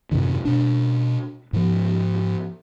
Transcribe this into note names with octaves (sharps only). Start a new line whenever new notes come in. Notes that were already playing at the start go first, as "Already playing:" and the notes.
F#2 A2 C3 D#3
B2 D4
G#2 F3